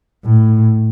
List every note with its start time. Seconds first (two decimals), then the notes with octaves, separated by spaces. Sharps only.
0.25 A2